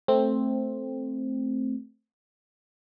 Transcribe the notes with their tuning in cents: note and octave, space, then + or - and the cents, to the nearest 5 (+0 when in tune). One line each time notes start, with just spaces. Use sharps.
A3 +0 C4 +5